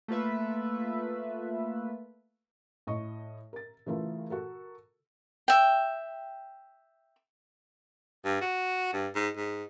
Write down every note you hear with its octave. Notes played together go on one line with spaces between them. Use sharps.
A3 A#3 F4 B4 E5
A2 D#5 C#6
A#4 A6
C#3 E3 A3 F4 A#4
F#4 A4 A#4
E5 G5
G2
F#4
G2
G#2
G#2